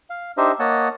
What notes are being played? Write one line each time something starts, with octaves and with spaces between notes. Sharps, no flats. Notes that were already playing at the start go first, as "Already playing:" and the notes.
F5
D4 D#4 G4 C5 D#5 E5
A#3 C#5 D#5 F#5 A5